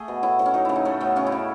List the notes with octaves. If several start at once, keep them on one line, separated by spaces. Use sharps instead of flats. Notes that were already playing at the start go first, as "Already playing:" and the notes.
Already playing: A3 G#4
B2
A2 E4
A2
C#4
F#3 D#4
C#3 E4
D#4
A3 C#4
A2 B3
C#3 C#4
E4
C#3